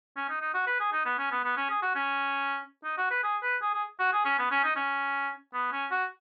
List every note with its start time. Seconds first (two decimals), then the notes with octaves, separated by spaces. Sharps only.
0.17 C#4
0.29 D#4
0.41 D#4
0.54 F#4
0.67 B4
0.80 G#4
0.92 D#4
1.05 B3
1.19 C#4
1.32 B3
1.44 B3
1.57 C#4
1.70 G#4
1.82 F#4
1.95 C#4
2.84 D#4
2.98 F#4
3.11 B4
3.23 G#4
3.43 B4
3.62 G#4
3.74 G#4
4.00 F#4
4.13 G#4
4.25 C#4
4.39 B3
4.51 C#4
4.64 D#4
4.76 C#4
5.54 B3
5.72 C#4
5.91 F#4